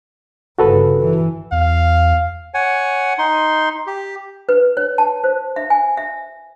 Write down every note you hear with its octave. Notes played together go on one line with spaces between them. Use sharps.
G1 C#3 F#4 A4 B4
E3
E2 F5
C#5 F#5 G#5
D#4 C6
G4
B4
C#5
A5
C5
E5
G#5
E5